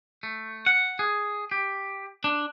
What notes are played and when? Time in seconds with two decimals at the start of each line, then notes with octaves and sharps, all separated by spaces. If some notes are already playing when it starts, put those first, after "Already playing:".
0.23 A3
0.66 F#5
0.99 G#4
1.51 G4
2.24 D4